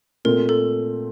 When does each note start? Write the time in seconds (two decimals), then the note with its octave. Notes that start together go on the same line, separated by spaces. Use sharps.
0.25 A#2 A3 C4 A#4
0.49 A4